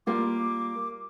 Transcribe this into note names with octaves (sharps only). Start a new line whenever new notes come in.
G3 A#3 F4 D6